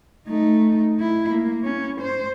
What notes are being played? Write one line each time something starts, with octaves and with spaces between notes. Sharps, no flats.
A3 D#4
E4
A#3
C#4
C5